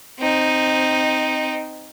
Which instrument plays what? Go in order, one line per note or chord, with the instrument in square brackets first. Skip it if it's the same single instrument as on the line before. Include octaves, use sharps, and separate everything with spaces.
[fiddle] C4 D#4